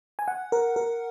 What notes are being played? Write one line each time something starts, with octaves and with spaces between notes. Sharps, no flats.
G#5
F#5
A#4
A#4